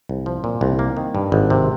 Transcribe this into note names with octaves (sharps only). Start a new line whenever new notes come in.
C2
F3
A#2
C2
A#3
D#3
G2
G#1
C3